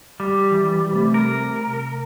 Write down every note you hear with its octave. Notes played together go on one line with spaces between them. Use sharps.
G3
E3
C3 A3
A#4